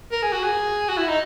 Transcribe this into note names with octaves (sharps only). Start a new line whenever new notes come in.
A#4
G#4
F#4
G#4
F#4
E4
D#4